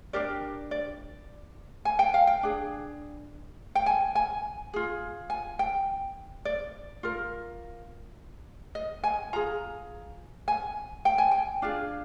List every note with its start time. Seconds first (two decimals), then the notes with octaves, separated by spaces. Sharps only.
0.13 D4 G4 A#4 D5
0.71 D5
1.85 G#5
1.99 G5
2.14 F5
2.27 G5
2.43 D4 G#4
3.75 G5
3.86 G#5
4.15 G#5
4.73 F4 G#4
5.30 G#5
5.59 G5
6.45 D5
7.03 F4 A#4
8.75 D#5
9.04 G#5
9.33 F4 G#4 A#5
10.48 G#5
11.05 G5
11.18 G#5
11.31 G5
11.62 D4 F4 G#4